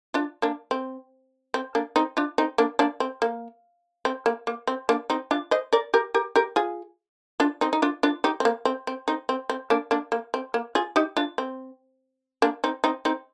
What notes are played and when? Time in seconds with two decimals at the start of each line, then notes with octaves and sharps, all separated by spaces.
0.14 D4 F4
0.42 A#3 D4
0.71 C4
1.54 C4
1.75 A#3 D4
1.96 C4 D#4
2.17 D4 F4
2.38 C4 D#4
2.58 A#3 D4
2.79 A#3 D4
3.00 C4
3.22 A#3
4.05 C4
4.26 A#3
4.47 A#3
4.67 C4
4.89 A#3 D4
5.10 C4 D#4
5.31 D4 F4
5.51 C5 D#5
5.73 A#4 D5
5.94 G4 A#4
6.14 G4 A#4
6.36 G4 A#4
6.56 F4 G#4
7.40 D4 F4
7.61 C4 D#4
7.73 D#4
7.82 D4 F4
8.03 D4 F4
8.24 D#4 G4
8.40 C4
8.45 A#3
8.65 C4
8.87 C4
9.08 C4 D#4
9.29 C4
9.49 C4
9.70 A#3 D4
9.91 A#3 D4
10.12 A#3
10.34 C4
10.54 A#3
10.75 F4 G#4
10.96 D#4 G4
11.17 D4 F4
11.38 C4
12.42 A#3 D4
12.64 C4 D#4
12.84 C4 D#4
13.05 C4 D#4